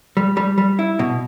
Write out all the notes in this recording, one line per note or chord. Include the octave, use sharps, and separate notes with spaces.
G3
G3
G3
E4
B2